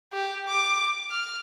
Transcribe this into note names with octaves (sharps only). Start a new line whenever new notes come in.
G4
D6
F6